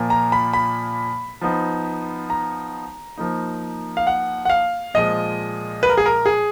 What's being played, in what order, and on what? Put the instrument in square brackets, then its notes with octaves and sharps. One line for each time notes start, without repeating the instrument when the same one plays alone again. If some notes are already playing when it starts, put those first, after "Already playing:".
Already playing: [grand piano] A#2 F3 A#3
A#5
B5
B5
F3 B3 D#4
A#5
F3 A#3 D#4
F5
F#5
F#5
F5
A#2 F3 G#3 D#5
B4
A#4
G#4
A#4
G#4